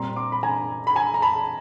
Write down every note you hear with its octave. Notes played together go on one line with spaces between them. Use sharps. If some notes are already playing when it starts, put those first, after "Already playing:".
Already playing: A#2 G3 C4 A#5 C6
C6 D6
B5
G#5 A#5
B5
G#5 A#5
A#5
A5 B5